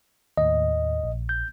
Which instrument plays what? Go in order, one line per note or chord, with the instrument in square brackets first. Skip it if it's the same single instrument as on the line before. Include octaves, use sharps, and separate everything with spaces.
[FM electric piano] D#2 A2 [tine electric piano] D#5
[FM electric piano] A#1
[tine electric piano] G6